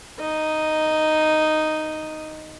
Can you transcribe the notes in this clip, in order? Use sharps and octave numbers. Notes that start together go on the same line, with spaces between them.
D#4 D#5